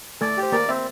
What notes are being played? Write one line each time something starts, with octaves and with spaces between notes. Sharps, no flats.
A3 A4 D5
G4
C5
A#3 A#4 D5
C4 E5